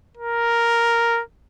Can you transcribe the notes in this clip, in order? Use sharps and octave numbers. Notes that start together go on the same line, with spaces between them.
A#4